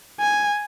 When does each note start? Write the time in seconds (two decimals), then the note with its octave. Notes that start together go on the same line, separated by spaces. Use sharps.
0.20 G#5